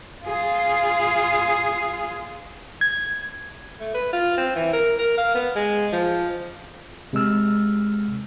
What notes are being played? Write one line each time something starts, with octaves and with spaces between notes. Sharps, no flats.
F4 G#4
G#6
A3
B4
F4
C4
E3
A#4
A#4
F5
B3
G#3
F3
C3 G#3 E6 F6